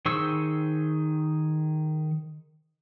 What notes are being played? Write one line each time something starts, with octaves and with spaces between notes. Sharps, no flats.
D#3 G#4 C5 C#6 E6